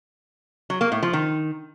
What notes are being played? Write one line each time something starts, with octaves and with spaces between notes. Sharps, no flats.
F#3
A#3
A2
F3
D#3